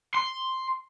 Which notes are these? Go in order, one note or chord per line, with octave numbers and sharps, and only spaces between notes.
C6